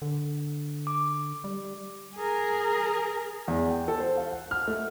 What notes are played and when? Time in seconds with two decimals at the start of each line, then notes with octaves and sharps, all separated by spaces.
0.02 D3
0.87 D6
1.44 G3
2.16 G#4 A#4
3.48 E2
3.70 G5
3.88 A4
4.00 C5
4.17 F5
4.32 F#5
4.51 F6
4.68 A3